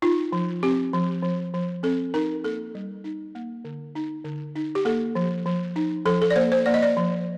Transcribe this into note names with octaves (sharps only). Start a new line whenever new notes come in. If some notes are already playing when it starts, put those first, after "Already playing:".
D#4 F4
F3
C4 G4
F3
F3
F3
C4 A4
D#4 A#4
A#3 A4
G3
D#4
A#3
D3
D#4
D3
D#4
G4
A#3 A4
F3
F3
D#4
F3 A4
A4
D5
A#3 C5
C5
A#3 D5
D#5
D5
F3